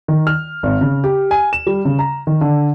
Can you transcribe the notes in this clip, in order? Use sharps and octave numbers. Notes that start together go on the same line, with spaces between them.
D#3
F6
G#1
C#3
G4
G#5
E7
G3
C#3
A#5
D#3
D3